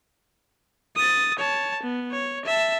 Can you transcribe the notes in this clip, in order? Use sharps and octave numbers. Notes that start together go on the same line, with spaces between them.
D#6 A6
C#5 A5
B3
C#5
E5 A5